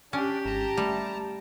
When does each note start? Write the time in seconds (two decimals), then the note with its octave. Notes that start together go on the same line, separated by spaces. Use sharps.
0.13 C#4 D4 G4 D5
0.45 G#1 A5 A#5
0.77 G3 A3